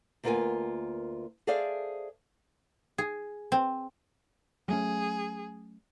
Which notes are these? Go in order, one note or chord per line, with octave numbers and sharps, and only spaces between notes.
D2 A#3 B3 F4 A#4 G#5
G#4 A4 C5 D5 E5 F5
G#4
C4
F#3 A3 C#4 G#4